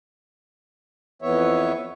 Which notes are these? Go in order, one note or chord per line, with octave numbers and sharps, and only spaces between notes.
F2 E3 B3 C#5 E5